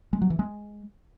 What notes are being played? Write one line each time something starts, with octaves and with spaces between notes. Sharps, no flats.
G#3
F#3
E3
G#3